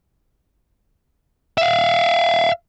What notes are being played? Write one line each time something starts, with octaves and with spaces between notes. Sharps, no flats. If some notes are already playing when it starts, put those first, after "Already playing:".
E5 F5